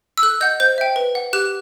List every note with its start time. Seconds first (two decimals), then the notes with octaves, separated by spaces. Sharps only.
0.18 E6
0.23 A4 F#6
0.41 D#5 F#5 G6
0.60 C5 G6
0.78 E5 G5
0.96 B4
1.15 F#5
1.33 G4 F#6